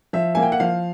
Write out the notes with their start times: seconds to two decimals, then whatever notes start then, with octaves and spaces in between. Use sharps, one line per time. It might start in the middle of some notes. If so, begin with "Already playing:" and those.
0.13 F3 E5
0.35 A#3 G#5
0.43 G5
0.52 F#5
0.60 F3 F5